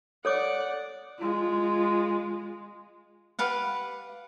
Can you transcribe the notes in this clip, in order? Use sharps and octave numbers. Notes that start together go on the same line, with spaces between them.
A4 C#5 D5 F#5 D6
G#3 F4
G4 B4 F5 F#5